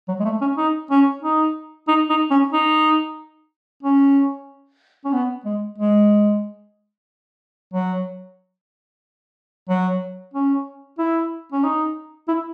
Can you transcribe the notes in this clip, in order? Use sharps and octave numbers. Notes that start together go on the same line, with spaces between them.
F#3
G#3
A3
C#4
D#4
C#4
D#4
D#4
D#4
C#4
D#4
C#4
C#4
B3
G#3
G#3
F#3
F#3
C#4
E4
C#4
D#4
E4